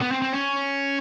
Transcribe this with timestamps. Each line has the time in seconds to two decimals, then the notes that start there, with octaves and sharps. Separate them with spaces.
0.02 B3
0.12 C4
0.22 C4
0.33 C#4